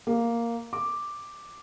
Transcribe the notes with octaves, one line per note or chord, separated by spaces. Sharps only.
A#3
D6